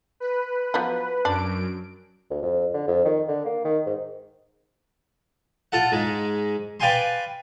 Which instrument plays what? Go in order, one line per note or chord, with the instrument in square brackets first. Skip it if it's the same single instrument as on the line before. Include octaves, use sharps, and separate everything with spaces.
[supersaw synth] B4
[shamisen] F3 F#3 B3
[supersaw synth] F#2 D7 [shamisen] D4
[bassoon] D2
F2
D3
F2
D#3
D3
A#3
D#3
G#2
[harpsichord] F4 A4 F#5
G#2 G#3
B4 D5 F5 G5 G#5 C6